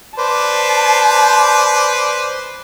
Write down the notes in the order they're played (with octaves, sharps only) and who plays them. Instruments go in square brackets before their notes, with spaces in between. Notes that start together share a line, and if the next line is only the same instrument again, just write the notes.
[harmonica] B4 C5 D5 [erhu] A5